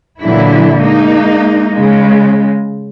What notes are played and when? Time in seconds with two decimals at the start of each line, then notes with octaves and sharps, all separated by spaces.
0.22 A#2 D3 E3 F#3 E4
0.80 G#3 A#3 D#4
1.72 C#3 G#3